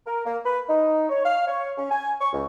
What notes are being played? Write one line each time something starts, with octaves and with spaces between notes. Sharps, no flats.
A#4
A#3
B4
D#4
C#5
F5
C#5
C#4
G#5
C#6
C#2